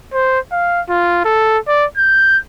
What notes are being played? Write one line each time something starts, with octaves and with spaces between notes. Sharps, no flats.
C5
F5
F4
A4
D5
G6